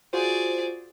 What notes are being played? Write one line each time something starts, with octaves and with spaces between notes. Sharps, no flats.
F4 F#4 G#4 C5 D5